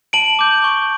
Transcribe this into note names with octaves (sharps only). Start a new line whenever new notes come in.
A5 D7 F#7
D6 G6
C#6